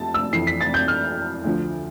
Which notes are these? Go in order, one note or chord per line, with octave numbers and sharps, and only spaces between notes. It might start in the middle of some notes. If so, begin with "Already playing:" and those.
Already playing: F2 C3 A5
E6
F2 E3 C7
B6
A6
G6
F6
D2 D3 F3